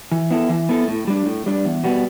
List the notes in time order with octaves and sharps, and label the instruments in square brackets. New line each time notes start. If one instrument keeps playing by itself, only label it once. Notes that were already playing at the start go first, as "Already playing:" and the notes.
[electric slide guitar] E3
B3 E4 A4
E3
B3 E4 A4
A2
G3 D4
A2
G3 D4
E2
B2 G3 B3